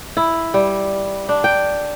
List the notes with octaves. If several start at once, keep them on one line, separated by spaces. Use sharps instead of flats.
E4
G3
D4
G5